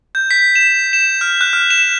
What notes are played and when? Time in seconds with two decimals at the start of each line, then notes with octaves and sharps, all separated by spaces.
0.15 G6
0.31 B6
0.55 E7
0.93 E7
1.21 F6
1.41 F#6
1.53 F6
1.70 E7